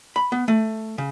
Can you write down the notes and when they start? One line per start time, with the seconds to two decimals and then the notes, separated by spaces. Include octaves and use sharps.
0.16 B5
0.32 B3
0.48 A3
0.98 C#3